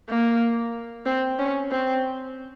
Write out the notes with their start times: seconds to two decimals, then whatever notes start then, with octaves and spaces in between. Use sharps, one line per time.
0.09 A#3
1.06 C4
1.39 C#4
1.71 C4